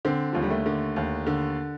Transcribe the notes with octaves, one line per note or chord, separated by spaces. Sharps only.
D3 C4
D#2 F3
G3
A3
D3
D#2
D3